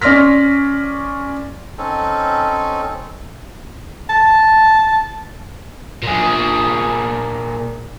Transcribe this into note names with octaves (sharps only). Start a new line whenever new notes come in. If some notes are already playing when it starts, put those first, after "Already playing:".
C#4 D5 C6 F6 A#6 B6
C4 C#4 D#4 A4
A5
A#2 G#4